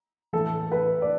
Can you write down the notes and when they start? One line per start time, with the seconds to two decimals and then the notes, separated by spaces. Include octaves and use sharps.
0.33 A2 E3 A4
0.72 B4
1.02 D5